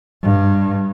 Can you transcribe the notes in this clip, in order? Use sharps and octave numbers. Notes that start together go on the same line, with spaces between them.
G2